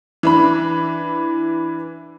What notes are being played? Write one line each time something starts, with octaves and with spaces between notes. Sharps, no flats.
E3 D4 B5